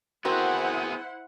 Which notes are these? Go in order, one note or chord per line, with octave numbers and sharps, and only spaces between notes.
B3 C4 E4 F#4 G#4 A#4 C5 F#5